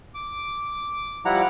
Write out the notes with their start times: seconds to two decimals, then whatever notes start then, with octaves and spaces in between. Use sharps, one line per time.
0.15 D6
1.25 F3 G3 E4 F#5 A#5